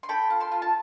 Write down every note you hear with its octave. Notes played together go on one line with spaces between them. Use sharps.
C6
A4 G5 B5
F4
A5 C6
F4
A5